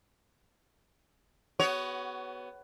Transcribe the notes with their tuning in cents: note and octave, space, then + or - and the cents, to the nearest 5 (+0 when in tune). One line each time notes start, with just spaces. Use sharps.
B3 +10 F#4 +35 C#5 +15